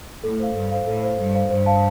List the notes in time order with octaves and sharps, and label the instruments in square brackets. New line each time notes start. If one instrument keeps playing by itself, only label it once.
[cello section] A2 [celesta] A4
[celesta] C5 F5
[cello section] G2 [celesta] A4
[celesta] C5 F5
[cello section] A2 [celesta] A4
[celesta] C5 F5
[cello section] G2 [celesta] A4
[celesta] C5 F5
[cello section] G2 [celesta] C5
[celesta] F5 A5